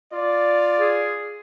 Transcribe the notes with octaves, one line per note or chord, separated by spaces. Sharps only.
F4 D5
G#4